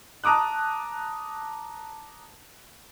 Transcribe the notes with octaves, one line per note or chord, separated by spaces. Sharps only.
A5 A#5 D6 D#6 F#6